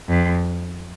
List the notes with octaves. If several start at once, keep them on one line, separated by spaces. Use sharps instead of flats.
F2